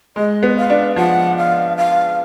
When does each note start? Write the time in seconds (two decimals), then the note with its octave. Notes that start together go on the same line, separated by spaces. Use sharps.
0.16 G#3 D#5
0.43 B3
0.57 F5
0.70 D4
0.96 F3 F#5
1.38 F5
1.78 F5